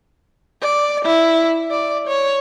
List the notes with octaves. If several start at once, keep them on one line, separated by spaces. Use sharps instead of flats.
D5
E4
D5
C#5